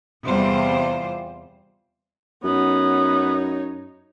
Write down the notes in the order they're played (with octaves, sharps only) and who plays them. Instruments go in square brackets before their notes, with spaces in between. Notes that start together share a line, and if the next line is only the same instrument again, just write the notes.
[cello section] E2 C3 G3 F4 C5
[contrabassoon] F#2 [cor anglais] B3 [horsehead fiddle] D#4 C#5